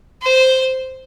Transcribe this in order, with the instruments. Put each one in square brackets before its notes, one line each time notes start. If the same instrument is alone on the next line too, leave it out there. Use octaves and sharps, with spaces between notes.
[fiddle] C5